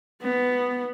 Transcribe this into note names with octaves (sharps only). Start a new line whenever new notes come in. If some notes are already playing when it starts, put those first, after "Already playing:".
B3